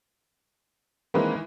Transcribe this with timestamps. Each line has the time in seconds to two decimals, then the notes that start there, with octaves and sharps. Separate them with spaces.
1.14 D#3 E3 G#3 A#3 C4 B4